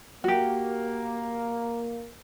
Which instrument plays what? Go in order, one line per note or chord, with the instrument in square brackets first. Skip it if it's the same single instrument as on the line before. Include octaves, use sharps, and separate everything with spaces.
[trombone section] A#3 [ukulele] F#4 G4